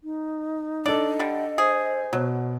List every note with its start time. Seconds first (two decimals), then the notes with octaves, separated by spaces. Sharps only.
0.04 D#4
0.86 D4 A4 D5 D#5
1.19 D3 G3
1.58 G#4 C5
2.13 B2 F#3